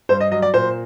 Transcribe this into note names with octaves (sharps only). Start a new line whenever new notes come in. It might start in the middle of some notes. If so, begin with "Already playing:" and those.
G2 C5
D#5
F#3 D#5
D5
A#2 C5